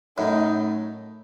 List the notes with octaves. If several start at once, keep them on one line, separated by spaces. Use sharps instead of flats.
F#2 A2 D#4